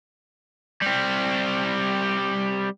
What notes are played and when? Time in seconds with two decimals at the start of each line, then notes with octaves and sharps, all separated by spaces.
0.82 G3 C4